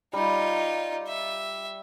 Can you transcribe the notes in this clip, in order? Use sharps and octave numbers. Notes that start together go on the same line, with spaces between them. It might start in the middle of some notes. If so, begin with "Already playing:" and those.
G3 D#4 F4
E5